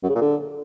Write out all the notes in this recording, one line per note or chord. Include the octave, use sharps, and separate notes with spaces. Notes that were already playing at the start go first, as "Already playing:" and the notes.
F#2
C#3
A#2
D3